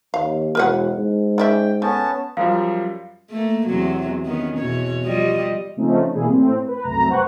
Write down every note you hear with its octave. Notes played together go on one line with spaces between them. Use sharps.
D#2 F5
E1 A#4 B4 F#5
G#2
C#4 D5 E5 G5
A3 B3 C#4 A5
F#2 F3 G3 F5
A3 A#3
E2 C3 F#3
D#3 B3 C#4
E2 B2 C#5
F3 G3 D#5
C#3 F3 A3 C4 C#4 D#4
B2 E3 G3 A#3 E4 G#4
A2 C4
B4
C2 F#2 A3 A#5
B4 C5 F#5 G5 C#6 F#6